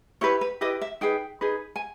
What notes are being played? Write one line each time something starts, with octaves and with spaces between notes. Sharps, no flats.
E4 G4 B4 C#5
B4
E4 G4 B4 D#5
E5
D#4 G#4 B4 G5
D#4 G#4 B4
G#5